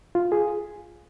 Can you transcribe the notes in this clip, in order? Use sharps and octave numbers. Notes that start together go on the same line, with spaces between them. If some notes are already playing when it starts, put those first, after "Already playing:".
F4
G#4